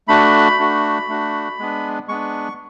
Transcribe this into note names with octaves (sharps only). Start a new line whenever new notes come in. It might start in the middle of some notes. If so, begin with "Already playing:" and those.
A3 D4 F#4 B5
A3 D4 F#4
A3 D4 F#4
G#3 B3 D4
G#3 B3 D4 C#6